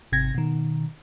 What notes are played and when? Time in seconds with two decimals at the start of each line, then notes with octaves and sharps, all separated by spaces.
0.12 G#1 C3 G#6 A#6
0.35 B2 D#3